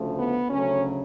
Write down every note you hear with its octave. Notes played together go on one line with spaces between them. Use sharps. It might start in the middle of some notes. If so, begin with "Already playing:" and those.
Already playing: D2 C#3 F3 A3
B3
D2 C#3 F#3 A3 C#4